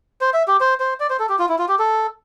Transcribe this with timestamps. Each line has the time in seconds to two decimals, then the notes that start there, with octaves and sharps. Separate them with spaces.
0.21 C5
0.34 E5
0.48 G4
0.61 C5
0.80 C5
1.00 D5
1.10 C5
1.20 A4
1.29 G4
1.39 F4
1.49 E4
1.59 F4
1.69 G4
1.79 A4